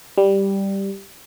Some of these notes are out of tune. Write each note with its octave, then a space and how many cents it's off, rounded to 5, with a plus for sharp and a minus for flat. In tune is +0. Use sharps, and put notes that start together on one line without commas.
G3 +0